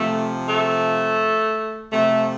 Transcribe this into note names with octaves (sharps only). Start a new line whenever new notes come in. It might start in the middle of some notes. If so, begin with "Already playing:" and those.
Already playing: C3 F3 A3
A3
C3 F3 A3